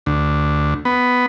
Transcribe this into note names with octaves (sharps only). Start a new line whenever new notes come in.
D2
B3